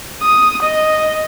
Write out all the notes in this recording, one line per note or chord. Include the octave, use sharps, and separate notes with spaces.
D#6
D#5